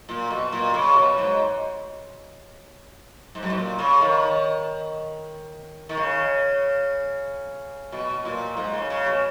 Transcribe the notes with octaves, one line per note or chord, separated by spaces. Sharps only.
A#2
B2
A#2
C#3
B2
G#2
G#2
F#2
G#2
A#2
C#3
D#3
D#3
C#3
B2
A#2
G#2
C#3
C#3
B2